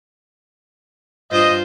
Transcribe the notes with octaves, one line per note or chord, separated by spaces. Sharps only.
G2 F4 C5 D#5